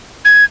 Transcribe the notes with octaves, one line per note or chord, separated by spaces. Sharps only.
G#6